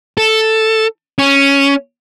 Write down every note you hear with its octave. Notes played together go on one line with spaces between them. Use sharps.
A4
C#4